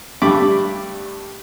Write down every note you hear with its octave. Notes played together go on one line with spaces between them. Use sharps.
G2 G3 A3 B5 D6